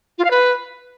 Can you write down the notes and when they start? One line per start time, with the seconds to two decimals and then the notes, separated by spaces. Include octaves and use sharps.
0.18 F4
0.25 F5
0.31 B4